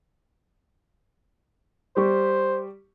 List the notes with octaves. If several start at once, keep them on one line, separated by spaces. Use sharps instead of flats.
G3 G4 C5 C#6